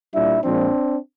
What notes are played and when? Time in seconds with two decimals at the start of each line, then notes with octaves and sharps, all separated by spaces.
0.13 A#2 G3 D4 E4
0.43 A#2 F3 G#3 C4 D4